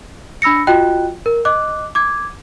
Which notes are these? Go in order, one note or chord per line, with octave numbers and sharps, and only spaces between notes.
D4 B5 E6 A#6 C#7
F4 F#4 D#5 G5 F#6
A#4
D#5 D6 F#6
D6 G#6